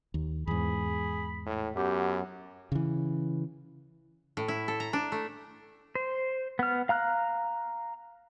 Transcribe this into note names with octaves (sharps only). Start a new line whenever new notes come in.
D#2
E2 G#2 G#4 B5
A2
F#2 B3 G4
C#3 E3
A2
E4
A4
A#5
D4
A3
C5
B3 F6
F5 A#5 F6 F#6